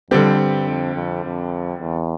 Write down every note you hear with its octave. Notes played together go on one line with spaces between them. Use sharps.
F2 D3 G3 C4 G4
G2
F2
F2
F2
E2